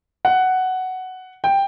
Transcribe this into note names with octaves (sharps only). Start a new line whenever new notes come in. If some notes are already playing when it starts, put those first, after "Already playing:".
F#5
G5